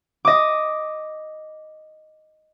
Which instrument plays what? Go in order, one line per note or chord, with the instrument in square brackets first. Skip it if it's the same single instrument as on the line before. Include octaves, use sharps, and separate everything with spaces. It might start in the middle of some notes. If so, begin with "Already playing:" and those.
[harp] D#5 D6